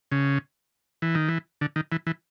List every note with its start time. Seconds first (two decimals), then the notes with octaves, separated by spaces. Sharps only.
0.12 C#3
1.02 E3
1.15 D#3
1.29 E3
1.61 D3
1.76 D#3
1.92 E3
2.07 E3